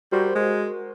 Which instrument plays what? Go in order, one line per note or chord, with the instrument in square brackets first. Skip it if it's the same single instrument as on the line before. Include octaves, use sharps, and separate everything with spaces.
[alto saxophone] G3 [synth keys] F#4 A#4 C5
[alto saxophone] G#3